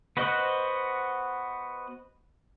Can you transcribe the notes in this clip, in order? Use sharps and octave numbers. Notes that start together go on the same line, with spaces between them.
B3 F#4 C5 D#5 F#6